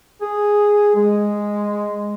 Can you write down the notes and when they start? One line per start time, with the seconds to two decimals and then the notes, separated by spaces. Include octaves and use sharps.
0.21 G#4
0.95 G#3